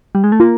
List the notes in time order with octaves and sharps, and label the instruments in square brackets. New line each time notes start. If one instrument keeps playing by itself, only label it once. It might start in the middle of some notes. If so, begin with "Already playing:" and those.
[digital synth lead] G3
G#3
A3
[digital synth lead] A#3 [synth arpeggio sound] F4